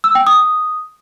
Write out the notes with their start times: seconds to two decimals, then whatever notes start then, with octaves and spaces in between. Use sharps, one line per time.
0.04 E6
0.15 G5
0.27 D#6